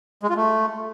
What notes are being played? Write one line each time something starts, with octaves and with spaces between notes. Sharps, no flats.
G#3
F4
A3